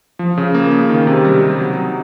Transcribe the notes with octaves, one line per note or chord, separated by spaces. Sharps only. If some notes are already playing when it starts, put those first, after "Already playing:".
F3
C#3
A#3
C#3
D#3
C3
G3
C3
F#3
D#4